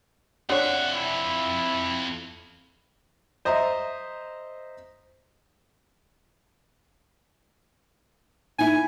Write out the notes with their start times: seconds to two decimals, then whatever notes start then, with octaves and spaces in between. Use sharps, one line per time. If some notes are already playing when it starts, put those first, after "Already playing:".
0.49 F2 D3 C#5 E5 F#5
0.94 E4
3.45 C5 D#5 E5 A#5
8.59 D#4 E4 G#5